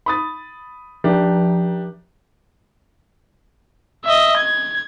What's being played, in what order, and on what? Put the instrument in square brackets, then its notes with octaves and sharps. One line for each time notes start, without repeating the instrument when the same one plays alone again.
[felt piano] B5 D#6 A6
[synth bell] F3 [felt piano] D4 G4
[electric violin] D#5 E5
G#6